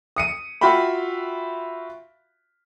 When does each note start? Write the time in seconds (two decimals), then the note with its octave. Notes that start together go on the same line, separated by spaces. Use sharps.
0.16 D#6 C#7 D#7
0.61 F4 F#4 E5 G5 B5